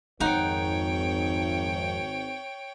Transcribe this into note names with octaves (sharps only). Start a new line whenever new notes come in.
G#1 F2 D#4 C#5 F#5 G5